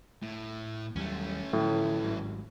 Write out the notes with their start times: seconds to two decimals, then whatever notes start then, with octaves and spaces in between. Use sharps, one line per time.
0.22 A2
0.96 D#2 F#3 G3 A3 C#4
1.53 A2 D3 F3 F#3
2.03 G#1 G#2 F#3